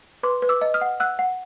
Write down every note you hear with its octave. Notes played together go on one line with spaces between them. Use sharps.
B4 C6 D6
B4
D6 E6
D#5
D#6 F6
F#5
F#5 E6 F#6
F#5